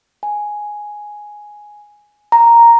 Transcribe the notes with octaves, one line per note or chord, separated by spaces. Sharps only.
G#5
A#5